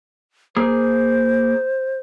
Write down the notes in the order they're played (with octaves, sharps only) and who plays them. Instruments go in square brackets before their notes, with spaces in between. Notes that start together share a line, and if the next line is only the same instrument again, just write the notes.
[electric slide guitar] A#3 G#4 [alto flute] C5